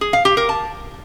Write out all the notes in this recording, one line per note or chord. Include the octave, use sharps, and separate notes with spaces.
G#4
F5
G4
A#4
A5